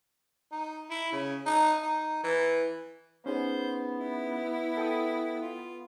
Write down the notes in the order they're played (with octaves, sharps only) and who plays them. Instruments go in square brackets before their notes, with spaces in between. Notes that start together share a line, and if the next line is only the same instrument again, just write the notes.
[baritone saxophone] D#4
E4
C#3
D#4
D#4
E3
[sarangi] B3 [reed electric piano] C#4 D#4 G#4 [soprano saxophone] C5
[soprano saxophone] E4
[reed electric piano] A4 G5 D#6
[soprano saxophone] F4